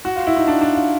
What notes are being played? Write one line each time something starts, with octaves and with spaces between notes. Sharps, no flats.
F#4
F4
E4
D#4
D4
D4
F4